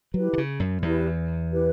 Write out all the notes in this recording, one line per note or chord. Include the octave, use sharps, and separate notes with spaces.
F#3 E4 G4 B4
D3
C#3
F#2
E2 E4 G4 B4
E4 G4 B4